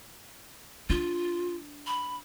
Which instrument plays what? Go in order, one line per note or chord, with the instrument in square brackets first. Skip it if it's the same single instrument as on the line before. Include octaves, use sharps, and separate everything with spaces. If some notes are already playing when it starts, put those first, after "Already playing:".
[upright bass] D4 [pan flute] F4
[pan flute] B5